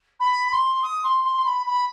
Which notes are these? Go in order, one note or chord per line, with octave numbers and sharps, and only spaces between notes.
B5
C6
D#6
C6
C6
C6
B5
B5